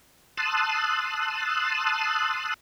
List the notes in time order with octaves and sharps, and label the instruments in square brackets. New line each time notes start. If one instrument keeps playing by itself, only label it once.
[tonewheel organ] A5 C6 D#6 E6 F#6